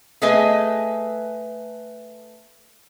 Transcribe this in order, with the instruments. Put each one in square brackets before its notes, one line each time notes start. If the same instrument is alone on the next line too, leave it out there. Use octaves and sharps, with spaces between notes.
[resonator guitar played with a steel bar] A3 G#4 B4 D#5 G#5